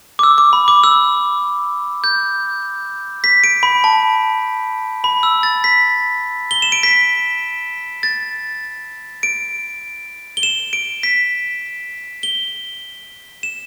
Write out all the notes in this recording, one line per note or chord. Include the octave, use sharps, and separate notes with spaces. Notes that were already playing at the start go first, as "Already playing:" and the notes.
D6
E6
D6
B5
D6
E6
G6
B6
D7
B5
A5
B5
E6
A6
B6
G7
E7
D7
B6
A6
D7
G7
E7
D7
B6
G7
E7